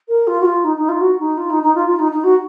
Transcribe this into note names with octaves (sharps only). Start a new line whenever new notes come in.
A#4
F4
F#4
F4
D#4
D#4
F4
F#4
D#4
F4
D#4
D#4
F4
F4
D#4
D#4
F#4